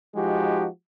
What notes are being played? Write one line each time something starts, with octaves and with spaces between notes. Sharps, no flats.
F3 G#3 D#4 F#4 G4